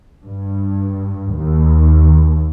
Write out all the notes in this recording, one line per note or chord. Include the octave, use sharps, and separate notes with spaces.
G2
D#2